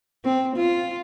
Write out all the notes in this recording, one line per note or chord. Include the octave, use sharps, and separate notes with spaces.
C4
F4